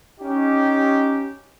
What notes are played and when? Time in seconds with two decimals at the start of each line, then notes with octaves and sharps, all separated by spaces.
0.21 C#4 D#4 G4